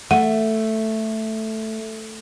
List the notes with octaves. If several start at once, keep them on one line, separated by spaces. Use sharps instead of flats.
A3 F#5